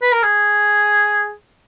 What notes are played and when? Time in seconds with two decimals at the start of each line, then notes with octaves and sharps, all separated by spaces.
0.02 B4
0.12 A#4
0.23 G#4